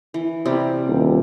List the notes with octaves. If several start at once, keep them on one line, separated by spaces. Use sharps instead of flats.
E3
C3 G3
D#1